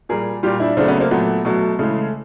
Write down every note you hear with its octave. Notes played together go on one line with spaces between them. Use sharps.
A#2 G3 G#4 A#4
A#2 G3 F4 G4
D4 E4
C#3 F#3 A3 C4 D4
B3 C#4
A#3 C4
A#2 F#3 A3 B3
B2 F#3 A3
C#3 E3 G#3 A3